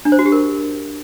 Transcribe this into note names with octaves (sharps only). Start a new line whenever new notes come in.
D4
C5
F#4
G4
A#4